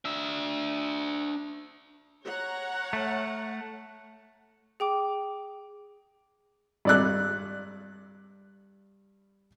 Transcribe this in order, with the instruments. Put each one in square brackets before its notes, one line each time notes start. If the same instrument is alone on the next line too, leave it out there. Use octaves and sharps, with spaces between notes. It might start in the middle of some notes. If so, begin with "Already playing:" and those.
[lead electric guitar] D4 E5
[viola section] C#5 F#5 A#5
[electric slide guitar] A3
[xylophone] G#4 G5 D6
[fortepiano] G2 D5 F#6